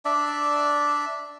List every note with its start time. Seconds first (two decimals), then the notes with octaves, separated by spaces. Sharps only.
0.05 D4 D5 E5